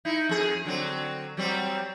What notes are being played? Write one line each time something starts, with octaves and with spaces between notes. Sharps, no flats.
D#4 E4
F2 G#4
D3 F#3 C4
F#3 G3 C4